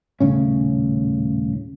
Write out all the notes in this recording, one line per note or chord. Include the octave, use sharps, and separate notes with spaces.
D#1 A2 C#3 C#4